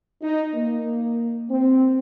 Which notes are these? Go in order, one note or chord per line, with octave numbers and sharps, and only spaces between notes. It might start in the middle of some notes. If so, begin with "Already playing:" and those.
D#4
A#3
C4